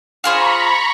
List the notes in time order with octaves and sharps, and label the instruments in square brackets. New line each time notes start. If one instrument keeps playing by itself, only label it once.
[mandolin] F4 G#4 C5 [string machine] A#5 B5 C#6